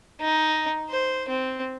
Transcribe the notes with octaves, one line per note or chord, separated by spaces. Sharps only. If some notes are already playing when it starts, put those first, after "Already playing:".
D#4
C5
C4